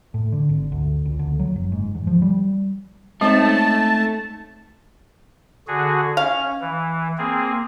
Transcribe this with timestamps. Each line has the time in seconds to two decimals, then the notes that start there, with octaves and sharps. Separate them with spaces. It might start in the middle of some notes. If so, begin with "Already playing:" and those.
0.14 A2
0.32 D3
0.49 G#1
0.72 D2
1.06 C#2
1.19 D2
1.39 F#3
1.56 F#1
1.72 G#2
1.94 E2
2.07 F3
2.22 G3
3.21 G#3 A3 C4 C#4 D#4 A5
5.68 D3 F#4 G#4
6.17 C#4 F5
6.61 E3
7.18 A#3 C4 G#4